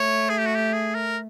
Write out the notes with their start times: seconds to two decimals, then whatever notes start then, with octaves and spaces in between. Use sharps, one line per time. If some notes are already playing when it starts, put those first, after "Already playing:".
Already playing: A3 C#5
0.29 G#4
0.38 G4
0.46 F#4
0.55 G4
0.73 G#4
0.95 A#4